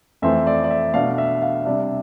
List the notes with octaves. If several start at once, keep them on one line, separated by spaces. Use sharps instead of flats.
F2 E3 A3 C4 E5
D5
D5
E5
B2 A3 D4 F5
E5
F5
C3 G3 D4 E5